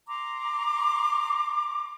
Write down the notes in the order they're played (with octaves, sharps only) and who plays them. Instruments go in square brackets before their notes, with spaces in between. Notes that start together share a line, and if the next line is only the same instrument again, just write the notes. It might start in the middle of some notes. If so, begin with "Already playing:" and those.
[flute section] A#5 C6 D6